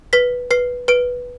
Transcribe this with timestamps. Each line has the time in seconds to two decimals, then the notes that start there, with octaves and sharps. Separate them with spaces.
0.13 B4 B6
0.51 B4 C7
0.88 B4 D7